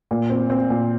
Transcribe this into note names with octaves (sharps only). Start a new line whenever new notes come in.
A#2
C4
C4
A#2